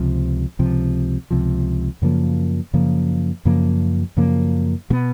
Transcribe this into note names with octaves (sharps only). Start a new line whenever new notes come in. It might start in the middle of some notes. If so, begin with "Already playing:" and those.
Already playing: C#2 C3 F3
C#2 C3 F3
C#2 C3 F3
F#2 C#3 F3 A#3
F#2 C#3 F3 A#3
F#2 C#3 F3 A#3
F#2 C#3 F3 A#3
B2 F#3 B3